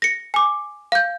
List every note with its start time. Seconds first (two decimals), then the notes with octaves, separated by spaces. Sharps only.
0.02 A#6 C#7
0.34 G#5 D6
0.92 F5 G6